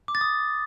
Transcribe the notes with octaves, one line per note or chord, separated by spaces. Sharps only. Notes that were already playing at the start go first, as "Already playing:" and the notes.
D6
A6
D#6